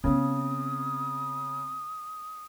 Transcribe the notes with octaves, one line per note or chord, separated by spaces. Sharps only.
C#3 B3 C4 D#6